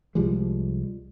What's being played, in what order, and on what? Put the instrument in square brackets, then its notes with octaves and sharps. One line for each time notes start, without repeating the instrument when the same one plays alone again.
[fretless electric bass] C2 F3 G3 G#3